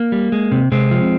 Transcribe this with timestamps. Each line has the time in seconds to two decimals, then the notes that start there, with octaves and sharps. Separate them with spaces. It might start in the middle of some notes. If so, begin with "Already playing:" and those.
Already playing: A#3
0.12 G3
0.32 G#3
0.52 C3
0.72 C3 G#3 C4
0.91 F3